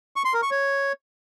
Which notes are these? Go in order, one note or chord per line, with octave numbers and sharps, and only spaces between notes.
C#6
C6
A#4
C#6
C#5